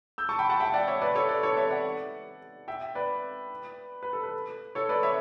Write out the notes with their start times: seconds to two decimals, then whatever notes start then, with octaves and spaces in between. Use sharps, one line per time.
0.18 E6 G6
0.29 A5 C#6
0.39 G5 B5
0.49 F#5 A5
0.60 E5 G5
0.74 D5 F#5
0.88 C#5 E5
1.02 B4 D5
1.15 A4 C#5
1.29 B4 D5
1.43 A4 C#5
1.57 C#5 E5
1.71 D5 F#5
2.68 E5 G5
2.95 B4 D5
4.03 B4
4.13 A4
4.23 B4
4.75 A4 C#5
4.89 B4 D5
5.03 C#5 E5